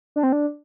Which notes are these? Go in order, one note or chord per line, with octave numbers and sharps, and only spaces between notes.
D4
C4
D4